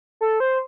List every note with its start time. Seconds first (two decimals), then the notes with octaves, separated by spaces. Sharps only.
0.21 A4
0.40 C5